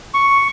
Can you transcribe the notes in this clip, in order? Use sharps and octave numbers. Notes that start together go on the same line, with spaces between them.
C#6